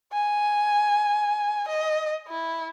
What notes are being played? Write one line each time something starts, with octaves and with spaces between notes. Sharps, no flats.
G#5
D#5
E4